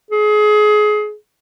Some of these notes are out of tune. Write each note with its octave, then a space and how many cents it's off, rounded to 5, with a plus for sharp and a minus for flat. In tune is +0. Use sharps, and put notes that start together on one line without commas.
G#4 +25